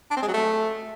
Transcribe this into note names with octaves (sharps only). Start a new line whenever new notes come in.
D4
C4
G#3
F#3
A3